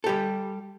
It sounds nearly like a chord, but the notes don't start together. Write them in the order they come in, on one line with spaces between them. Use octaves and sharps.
A4 G4 G3